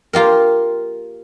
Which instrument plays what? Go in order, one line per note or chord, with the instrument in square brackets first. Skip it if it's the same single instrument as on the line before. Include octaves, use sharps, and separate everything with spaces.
[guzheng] A#3 F4 G4 A#4